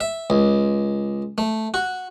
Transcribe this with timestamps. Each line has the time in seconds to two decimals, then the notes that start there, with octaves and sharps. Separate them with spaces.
0.01 E5
0.30 C#2
1.38 A3
1.74 F#4